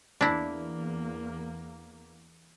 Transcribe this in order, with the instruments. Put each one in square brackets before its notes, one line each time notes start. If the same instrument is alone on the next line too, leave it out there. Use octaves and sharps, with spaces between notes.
[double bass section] E2 A#3 [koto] D4 E4